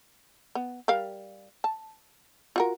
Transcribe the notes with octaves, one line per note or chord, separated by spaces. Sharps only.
B3
G3 A#4 F5
A5
F4 F#4 A#4